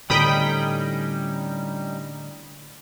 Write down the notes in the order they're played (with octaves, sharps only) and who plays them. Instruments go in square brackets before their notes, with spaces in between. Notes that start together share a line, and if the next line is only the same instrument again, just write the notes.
[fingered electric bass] A2 D3 [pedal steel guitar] G3 C#4 D#4 [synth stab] G5 B5 D#6